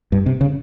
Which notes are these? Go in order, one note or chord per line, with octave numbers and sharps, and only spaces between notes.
G2
C3
C#3